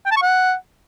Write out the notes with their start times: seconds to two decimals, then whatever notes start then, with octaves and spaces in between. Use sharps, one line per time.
0.06 G5
0.11 A5
0.17 C#6
0.22 F#5